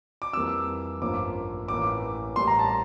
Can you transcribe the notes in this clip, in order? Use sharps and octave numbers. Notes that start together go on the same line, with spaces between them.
D6
F2 E3 G3 A#3 E6
A1 G2 F3 A#3 D6
A1 A2 E3 A#3 D6
A1 A2 G3 A#3 C6
A#5
A5